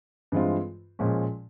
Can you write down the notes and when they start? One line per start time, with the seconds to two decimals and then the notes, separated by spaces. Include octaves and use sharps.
0.32 G2 E3 G#3 C4 F4
0.99 A#2 F3 G#3 C#4